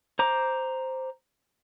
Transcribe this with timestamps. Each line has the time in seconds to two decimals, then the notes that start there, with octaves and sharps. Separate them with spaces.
0.19 C5 A#5 D6